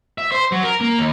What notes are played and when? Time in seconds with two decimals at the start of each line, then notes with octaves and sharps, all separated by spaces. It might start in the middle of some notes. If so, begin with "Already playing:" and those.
0.18 E5
0.32 C5
0.52 F#3
0.63 A#4
0.81 A#3
0.99 D#2